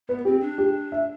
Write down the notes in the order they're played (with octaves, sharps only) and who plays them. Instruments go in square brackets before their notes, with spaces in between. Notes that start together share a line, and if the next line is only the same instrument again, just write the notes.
[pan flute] B3 [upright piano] B4
[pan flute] C4 [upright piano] G4
[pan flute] D4
[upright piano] G4
E5